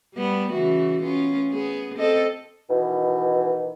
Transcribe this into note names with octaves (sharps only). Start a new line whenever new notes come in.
G3 B3
C#3 E3 F#4
B3 C#4 F4
B3 G#4
C4 A4 D#5
B2 D#3 E3